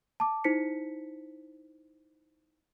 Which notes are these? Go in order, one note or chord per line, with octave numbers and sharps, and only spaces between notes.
A5 D6
D#4 E4 C5 B6 C#7